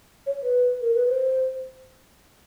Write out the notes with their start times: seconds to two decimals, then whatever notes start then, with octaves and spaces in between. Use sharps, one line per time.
0.26 C#5
0.43 B4
0.82 A#4
0.95 B4
1.08 C5